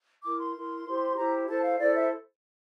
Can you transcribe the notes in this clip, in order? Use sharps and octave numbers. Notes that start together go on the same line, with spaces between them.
E4 A#4 D6
C6
E4 A#4
E4 G4 C5
E4 G4 C5 A#5
E4 A4 C5 A5
F5
E4 A4 C5 D5
E5